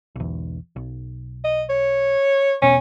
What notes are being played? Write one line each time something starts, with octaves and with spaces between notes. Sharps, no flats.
B1 E2
B1
D#5
C#5
E1 B2 C#4